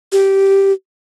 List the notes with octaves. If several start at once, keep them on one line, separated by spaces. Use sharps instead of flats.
G4